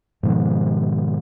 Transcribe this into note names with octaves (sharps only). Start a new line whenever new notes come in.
G#2 B2 D#3 F3